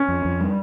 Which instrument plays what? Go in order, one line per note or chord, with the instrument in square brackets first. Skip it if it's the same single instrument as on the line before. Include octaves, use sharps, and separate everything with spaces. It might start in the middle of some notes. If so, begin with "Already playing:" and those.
Already playing: [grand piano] C#4
[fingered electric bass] F2
F2
G3